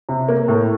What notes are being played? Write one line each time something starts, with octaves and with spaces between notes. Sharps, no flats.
C3
A#3
A2